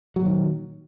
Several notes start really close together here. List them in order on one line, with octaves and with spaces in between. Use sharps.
F#3 A#2 D#3